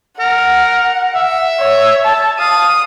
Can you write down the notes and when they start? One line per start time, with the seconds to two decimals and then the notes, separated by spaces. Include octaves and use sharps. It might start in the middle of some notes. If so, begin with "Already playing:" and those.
0.19 A#4 F#5
1.15 E5
1.59 C#5
2.05 A5
2.39 F5 D#6